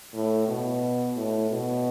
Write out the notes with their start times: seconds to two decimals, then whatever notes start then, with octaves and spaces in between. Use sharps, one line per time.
0.14 A2
0.48 B2
1.16 A2
1.51 B2